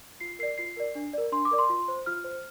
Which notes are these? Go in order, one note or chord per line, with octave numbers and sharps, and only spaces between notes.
F4 C7
A#4 D5 C7
F4 C7
A#4 D5
D4
A#4 D5
D4 C6
D6
A#4 D5
C6
F4
C5
F4 F6
C5